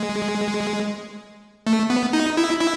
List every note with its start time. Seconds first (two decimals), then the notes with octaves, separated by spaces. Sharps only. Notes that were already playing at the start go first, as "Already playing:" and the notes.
Already playing: G#3
1.67 A3
1.90 B3
2.13 D#4
2.37 E4
2.61 E4